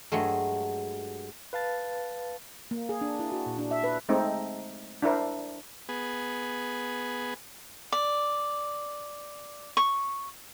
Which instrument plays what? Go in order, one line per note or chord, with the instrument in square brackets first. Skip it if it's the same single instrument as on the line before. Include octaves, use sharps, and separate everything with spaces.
[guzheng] G2 F#3 G#3 A3
[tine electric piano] B4 F5 A5 A6
[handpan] A#3
G#4
D4
E4
F#4
A#2
D4
E5
B4
[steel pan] G#3 A3 C4 D#4
D4 E4 A#4 C5
[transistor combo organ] B3 G#4
[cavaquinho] D5
C#6